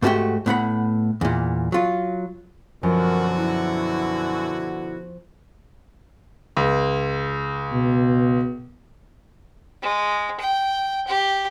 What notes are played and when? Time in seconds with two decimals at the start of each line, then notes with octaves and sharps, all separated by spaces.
0.02 G#2 A3 A#3 F#4 G4 G5
0.46 A2 B3 F#5 B5
1.21 E2 A#2
1.72 F#3 F4
2.83 F#2 B2 D3 F3 F#4 A#4
3.37 E4
6.57 C#2
7.72 B2
9.82 G#3
10.40 G5
11.07 G4